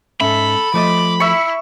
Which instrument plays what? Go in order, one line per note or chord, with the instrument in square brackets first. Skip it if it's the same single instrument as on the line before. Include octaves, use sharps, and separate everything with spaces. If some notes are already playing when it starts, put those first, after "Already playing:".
[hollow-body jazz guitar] G#2 C#4 E5 [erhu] A4 [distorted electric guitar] B5
[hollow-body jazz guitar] F3 A3 D#5 [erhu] D6
[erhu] E4 [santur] E5 C#6